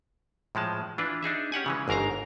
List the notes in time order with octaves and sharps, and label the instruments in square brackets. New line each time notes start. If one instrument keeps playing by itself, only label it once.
[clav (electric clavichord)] A2 F3 G#3 A5
E3 D4 F4 B4
D4 D#4 G#4 E5
C#4 G4 F#5 G#5
C#3 E3 G#3
G1 G#2 A#4 F5 A#5